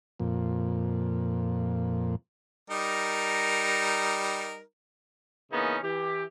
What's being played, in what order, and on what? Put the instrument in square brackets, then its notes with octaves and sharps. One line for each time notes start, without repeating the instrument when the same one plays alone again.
[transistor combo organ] F2 A#2
[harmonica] G3 D#4 A#4
[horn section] C#3 E3 A#3 B3 C#4 D#4
E3 G4